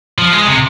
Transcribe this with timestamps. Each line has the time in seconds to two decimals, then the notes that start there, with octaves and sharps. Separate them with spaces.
0.18 F3
0.32 G#3
0.47 C3